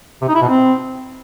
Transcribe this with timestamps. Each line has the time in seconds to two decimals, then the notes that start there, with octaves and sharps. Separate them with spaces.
0.22 C3
0.28 D#4
0.35 E4
0.41 B2
0.48 C4